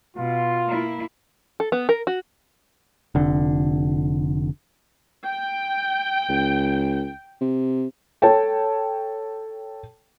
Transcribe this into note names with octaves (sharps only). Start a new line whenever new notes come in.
B2 F4
A#3 E4
A4
B3
A#4
F#4
F1 D3
G5
C#2
C3
A4 C#5 G5 A5